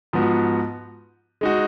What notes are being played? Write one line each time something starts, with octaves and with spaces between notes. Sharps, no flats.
G#2 F3 B3 F#4
G#3 D#4 F#4